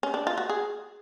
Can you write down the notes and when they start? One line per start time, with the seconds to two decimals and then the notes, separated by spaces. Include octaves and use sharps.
0.03 C#4
0.14 D4
0.27 F4
0.38 F#4
0.49 G#4